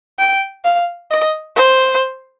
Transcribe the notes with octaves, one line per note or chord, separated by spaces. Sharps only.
G5
F5
D#5
C5